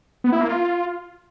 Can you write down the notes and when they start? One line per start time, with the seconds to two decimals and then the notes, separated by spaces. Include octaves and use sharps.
0.24 B3
0.32 E4
0.41 A#3
0.49 F4